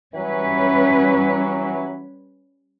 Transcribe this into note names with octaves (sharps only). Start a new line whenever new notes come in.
E3 F#3 G3 C#4 B4